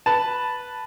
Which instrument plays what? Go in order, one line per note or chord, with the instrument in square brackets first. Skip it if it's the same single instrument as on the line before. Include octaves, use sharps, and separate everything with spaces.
[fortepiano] B4 A5